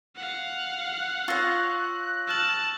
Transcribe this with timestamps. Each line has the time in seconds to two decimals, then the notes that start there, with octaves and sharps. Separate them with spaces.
0.16 F5 F#5
0.90 F#6
1.28 F4 C#5 C#6 E6 A#6
2.28 A5 E6 F6 F#7